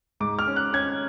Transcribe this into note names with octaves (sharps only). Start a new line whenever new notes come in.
G#2 D6
F6
C#4
F#6
C#4 G#6